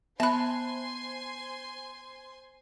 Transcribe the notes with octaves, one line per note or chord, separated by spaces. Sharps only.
B3 C5 E5 G#5 A5 B5 C6 F#6